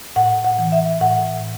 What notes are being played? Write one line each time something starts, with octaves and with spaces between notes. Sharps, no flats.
A2 F#5
F#5
E3
E5
A2 F#5